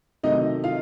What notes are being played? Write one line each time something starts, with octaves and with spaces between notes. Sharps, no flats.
C3 D#3 F#3 A3 D#4 D#5
F4 F5